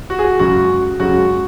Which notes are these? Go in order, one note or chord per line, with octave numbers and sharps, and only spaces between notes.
F#4
G#4
F#4
F#2 C#3 G#3 F#4
F#2 C#3 G#3 F#4